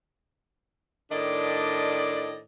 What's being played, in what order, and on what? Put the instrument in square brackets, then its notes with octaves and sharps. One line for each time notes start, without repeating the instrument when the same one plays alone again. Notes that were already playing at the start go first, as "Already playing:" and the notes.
[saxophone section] A2 D#3 D4 D5 D#5